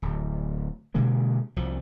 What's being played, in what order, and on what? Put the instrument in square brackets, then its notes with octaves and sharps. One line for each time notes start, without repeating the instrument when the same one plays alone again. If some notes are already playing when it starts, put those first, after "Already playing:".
[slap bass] D1
B2 D3 G#3 A#3
C2 F3